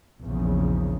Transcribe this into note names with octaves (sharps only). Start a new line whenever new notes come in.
A#1 E2 C#3